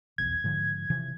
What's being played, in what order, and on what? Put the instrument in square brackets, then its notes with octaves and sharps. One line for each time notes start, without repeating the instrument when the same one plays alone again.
[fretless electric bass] F1 B1 E2 [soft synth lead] G#6
[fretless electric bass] G#2 D3 F3
C3 E3 F3